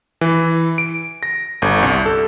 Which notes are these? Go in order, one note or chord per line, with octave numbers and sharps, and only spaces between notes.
E3
D7
A#6
G1
C2
A4